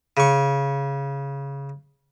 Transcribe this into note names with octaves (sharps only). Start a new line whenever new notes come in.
C#3 C#6